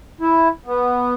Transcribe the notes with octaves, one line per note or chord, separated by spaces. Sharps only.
E4
B3